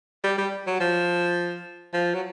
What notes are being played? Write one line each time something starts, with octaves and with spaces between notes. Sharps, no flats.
G3
G3
F#3
F3
F3
F#3